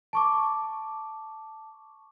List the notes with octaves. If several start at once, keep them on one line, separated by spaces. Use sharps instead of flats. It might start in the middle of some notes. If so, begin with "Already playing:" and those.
A5 C#6 D6